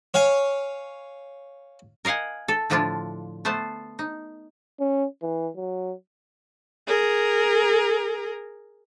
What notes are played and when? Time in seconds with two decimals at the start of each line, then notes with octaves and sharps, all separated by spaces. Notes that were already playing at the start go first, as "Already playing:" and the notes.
0.14 C#5 F5 G#5
2.05 A#4 D#5 F5 F#5 G#5
2.48 A4
2.70 A2 D3 F3 D4 E4 F4
3.45 A3 B3 C5 A5
3.99 D#4
4.80 C#4
5.22 E3
5.56 F#3
6.87 G#4 A#4